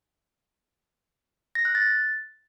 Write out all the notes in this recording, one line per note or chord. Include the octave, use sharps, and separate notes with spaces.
A#6
F#6
A6